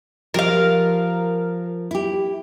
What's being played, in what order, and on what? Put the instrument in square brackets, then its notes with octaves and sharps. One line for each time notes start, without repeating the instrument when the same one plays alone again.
[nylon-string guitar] F3 G4 [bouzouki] A#4 F5
[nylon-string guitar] E4 G4